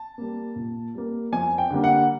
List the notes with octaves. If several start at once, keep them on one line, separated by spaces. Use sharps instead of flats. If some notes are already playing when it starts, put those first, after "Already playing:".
Already playing: A5
G3 A#3
A#2
G3 A#3
F2 G#5
G5
D3 G3 A#3
F#5